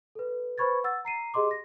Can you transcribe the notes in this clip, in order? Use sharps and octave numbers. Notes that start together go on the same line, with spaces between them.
A4 B4
B4 C5 B5 C#6 G#6 A6
F#5 E6 A6
A#5 C7 D#7
G4 G#4 D#5 C6 D6
A#6